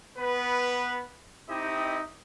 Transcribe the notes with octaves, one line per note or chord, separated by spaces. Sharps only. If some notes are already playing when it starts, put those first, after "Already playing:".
B3 B4
C4 D#4 E4 G4 D#5